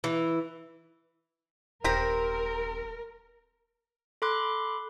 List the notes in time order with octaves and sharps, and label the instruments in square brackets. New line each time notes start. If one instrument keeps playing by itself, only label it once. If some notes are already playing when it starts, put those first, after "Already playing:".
[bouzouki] E3
[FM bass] D#1 [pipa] C4 G4 A#5 [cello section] A#4
[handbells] A4 B5 C6 D6 F#6